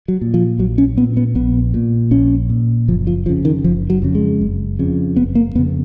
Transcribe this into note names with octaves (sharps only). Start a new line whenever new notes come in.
F#3
A#2
F3
A#1 F#3
C#4
A#2 B3
B3
A#1 B3
A#2
A#1 C#4
A#2
F#1 F3
F3
F2 C#3 F3
D#3
F#1 F3
F#3
F2 C#3
G#3
F#1
F2 C#3
F#1 B3
A#3
F2 C#3 B3